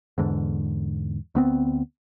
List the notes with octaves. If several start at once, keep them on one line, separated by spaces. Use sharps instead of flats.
E2 G#2 D3
D2 B3 C4